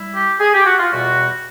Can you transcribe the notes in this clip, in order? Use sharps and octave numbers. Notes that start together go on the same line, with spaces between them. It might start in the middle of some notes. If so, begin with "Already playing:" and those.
Already playing: G3 E4
G4
G#4
G4
F#4
F4
E2 B2 G3 F#4